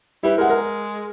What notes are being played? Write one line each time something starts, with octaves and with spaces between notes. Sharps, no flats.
G3 E4 B4
G#3 A#4 F#5
A#4